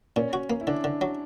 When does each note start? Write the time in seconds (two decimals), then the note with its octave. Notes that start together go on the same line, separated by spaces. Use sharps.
0.16 A#2 C#4
0.33 F#4
0.50 A#3
0.61 E4
0.67 D3 D4
0.84 D3
1.01 F#3